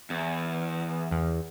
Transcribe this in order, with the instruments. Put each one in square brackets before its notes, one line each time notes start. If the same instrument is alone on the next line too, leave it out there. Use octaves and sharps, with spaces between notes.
[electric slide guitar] E2
[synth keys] E2